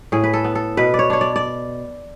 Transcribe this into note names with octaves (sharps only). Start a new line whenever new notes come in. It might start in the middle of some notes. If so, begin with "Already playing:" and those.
A2 G#4
B4
A4
B3
A4
B2 B4
D5
C#5
D4 C#5
D5
D5